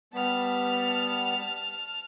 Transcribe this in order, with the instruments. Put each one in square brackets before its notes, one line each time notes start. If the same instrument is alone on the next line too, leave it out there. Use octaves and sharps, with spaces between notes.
[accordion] G3 B3 [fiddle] A5 F6